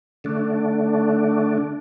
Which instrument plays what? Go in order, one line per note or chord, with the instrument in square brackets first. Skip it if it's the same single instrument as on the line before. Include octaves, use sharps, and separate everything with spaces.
[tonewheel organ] D3 A3 D4